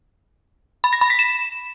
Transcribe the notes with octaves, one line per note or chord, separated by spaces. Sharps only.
B5
A#6
B5
B6
E7